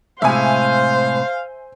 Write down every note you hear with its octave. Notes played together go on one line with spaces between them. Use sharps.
A2 C3 G#3 C5 E5 F5 G#5